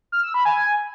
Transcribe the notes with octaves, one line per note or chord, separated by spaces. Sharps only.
F6
E6
B5
G#5